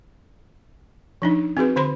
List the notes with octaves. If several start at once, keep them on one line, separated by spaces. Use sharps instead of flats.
F3 D4 D#4
C4 F#4 G#4 B4
D3 C5 B5 C6